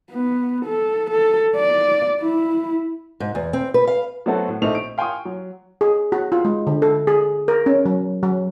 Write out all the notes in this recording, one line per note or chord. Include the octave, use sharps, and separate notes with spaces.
B3
A4
A4
D5
E4
G#2
E2
C4
B4
F5
F#3 A3 B3 C4 F#4 A4
A2
A#1 A3 C4 D#4 C5 F7
D7
F5 G5 G#5 C6 C#6 D#6
F#3
G#4
F#4
F4
G#3
D3
A4
G#4
A#4
C#4
F#3
F#3